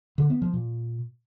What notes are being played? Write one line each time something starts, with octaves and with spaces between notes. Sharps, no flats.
D3
B3
F3
A#2